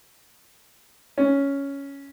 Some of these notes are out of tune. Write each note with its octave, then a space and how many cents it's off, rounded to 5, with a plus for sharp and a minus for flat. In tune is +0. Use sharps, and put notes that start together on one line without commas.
C#4 +5